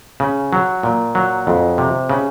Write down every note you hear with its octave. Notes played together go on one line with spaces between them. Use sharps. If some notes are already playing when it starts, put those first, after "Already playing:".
C#3
F#3
A#2
F#3
F2
C3
C#3